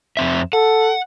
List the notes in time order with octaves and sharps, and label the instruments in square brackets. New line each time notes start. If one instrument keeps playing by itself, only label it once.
[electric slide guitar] F2 C4 E5
[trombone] A4 [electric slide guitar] F#5